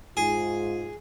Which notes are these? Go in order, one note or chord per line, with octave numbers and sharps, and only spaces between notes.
G#2 F4 G#4